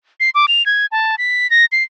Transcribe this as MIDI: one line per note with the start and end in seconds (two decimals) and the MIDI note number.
0.20 0.30 96
0.35 0.46 86
0.48 0.65 101
0.66 0.86 92
0.92 1.15 81
1.18 1.50 95
1.50 1.65 94
1.72 1.83 96